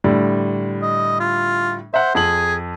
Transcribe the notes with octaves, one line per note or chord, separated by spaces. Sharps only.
A2 D3 G3
D#5
F4
C5 E5 F#5
F2 G#4 F#7